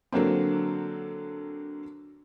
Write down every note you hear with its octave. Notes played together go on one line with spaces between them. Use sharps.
D3 F#3 A#3 C4